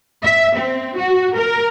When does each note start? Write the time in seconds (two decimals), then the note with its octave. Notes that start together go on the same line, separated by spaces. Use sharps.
0.25 E5
0.56 C4
0.97 F#4
1.37 A#4